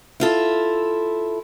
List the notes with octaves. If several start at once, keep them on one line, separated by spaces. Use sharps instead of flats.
E4 F4 A4